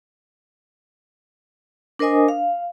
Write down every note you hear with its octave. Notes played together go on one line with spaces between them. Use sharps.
D4 A#4 C5 D#5 G#5 D#6
F5